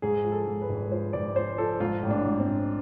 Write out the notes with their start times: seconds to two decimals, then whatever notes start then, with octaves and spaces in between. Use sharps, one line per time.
0.02 G#2 G#4
0.24 F3
0.32 A4
0.47 G#2
0.61 B4
0.69 G#1
0.91 F3 C5
1.13 G#1 D5
1.35 F3 C5
1.58 F3 A4
1.80 G#2 F4
2.02 A1
2.10 D4
2.25 G#2
2.40 C4
2.47 A1